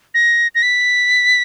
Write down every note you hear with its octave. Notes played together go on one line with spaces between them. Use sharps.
A#6
A#6
B6